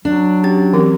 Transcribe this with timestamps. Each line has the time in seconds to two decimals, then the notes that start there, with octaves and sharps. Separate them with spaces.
0.05 F#3 D4
0.43 C#4 G4 A6
0.73 E3 C4 G4